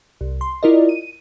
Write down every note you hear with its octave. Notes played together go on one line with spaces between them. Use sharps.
C2
C6
E4 F4 A#4 D5 D#5
D#7